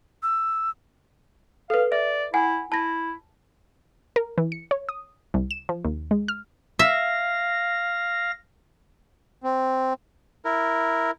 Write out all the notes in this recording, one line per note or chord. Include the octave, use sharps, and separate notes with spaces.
E6
A4 B4 F5
D5 E5
E4 F#5 G#5
E4 A5 A#6
A#4
E3
C#7
C#5
D#6
C2
E7
F3
D#2
G#3
F6
E5 F5 A#6
C4
E4 A#4